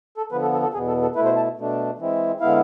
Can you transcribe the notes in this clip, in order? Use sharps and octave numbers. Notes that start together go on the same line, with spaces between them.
A4
D3 F3 B3 B4
A4
A4
A4
E2 B2 B3 G#4
A4
A4
B2 A3 E4 B4
C5
A5
B2 A3 D4
E3 G#3 C4 E4
D3 G#3 B3 E4 F5